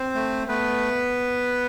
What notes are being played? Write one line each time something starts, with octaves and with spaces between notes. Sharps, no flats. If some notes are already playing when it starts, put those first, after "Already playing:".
Already playing: C4 C5
A3
A3 B3 B4